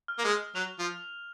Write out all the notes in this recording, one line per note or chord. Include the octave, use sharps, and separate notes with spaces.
F6
A#3
G#3
F#3 F7
F3